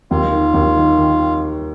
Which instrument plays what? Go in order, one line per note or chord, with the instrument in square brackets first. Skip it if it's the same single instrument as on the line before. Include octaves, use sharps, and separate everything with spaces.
[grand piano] D#2 [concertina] F4
[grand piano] D#3
D#2
D#3
D#3